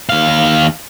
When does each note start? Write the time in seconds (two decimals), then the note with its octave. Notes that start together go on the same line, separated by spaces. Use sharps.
0.09 D#2 F5